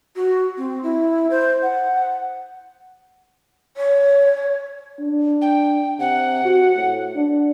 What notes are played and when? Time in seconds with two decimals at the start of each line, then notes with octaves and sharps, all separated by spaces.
0.16 F#4
0.58 C4
0.83 E4
1.31 C5
1.63 F#5
3.76 C#5
4.99 D4
5.42 G5
5.99 C3 F#5
6.45 F#4
6.76 A2
7.15 D4